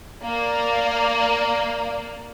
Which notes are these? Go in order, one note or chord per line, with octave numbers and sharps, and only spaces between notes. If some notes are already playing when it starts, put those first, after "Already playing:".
A#3 D5